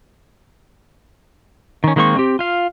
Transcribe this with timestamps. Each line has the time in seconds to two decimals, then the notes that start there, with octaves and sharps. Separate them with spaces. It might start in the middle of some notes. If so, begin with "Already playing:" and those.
1.84 D#3 C#4
1.96 D#3 G#3 A#3 C4 C#6
2.17 C4 G4
2.39 F4 F5